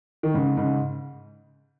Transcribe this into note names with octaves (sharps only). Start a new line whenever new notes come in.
D#3
G#2 C#3
G#2 C#3